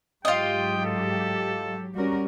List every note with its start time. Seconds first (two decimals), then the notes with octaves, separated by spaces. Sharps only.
0.25 G#2 F#3 F4 G4 D#5 G5
0.85 A4
1.95 G3 C#4 F#4 A#4